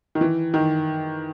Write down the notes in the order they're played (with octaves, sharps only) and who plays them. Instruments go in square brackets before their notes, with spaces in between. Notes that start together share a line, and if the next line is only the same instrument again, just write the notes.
[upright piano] D#3
E3
D#3